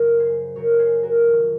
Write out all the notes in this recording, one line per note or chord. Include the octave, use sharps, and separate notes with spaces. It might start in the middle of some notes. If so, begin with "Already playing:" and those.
Already playing: F#2 C#3 F#3 F#4 A#4
G#4 C5
F#2 C#3 F#3 A#4 C#5
G#4 C5
F#4 A#4
F2 C3 D#3 F#3